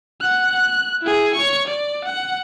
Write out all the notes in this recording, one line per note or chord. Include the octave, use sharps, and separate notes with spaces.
F#5 F#6
F#6
E4 G#4
C#5 C#6
D5
F#5